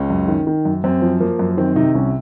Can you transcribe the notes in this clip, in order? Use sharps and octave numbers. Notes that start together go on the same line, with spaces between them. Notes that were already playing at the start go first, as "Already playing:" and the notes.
Already playing: C#2 C#4
F#2
D#3
D#3
F#2
F#2 C4
F3
F3 A#3
F#2
D#3 C4
C3 D#4
C2 C#4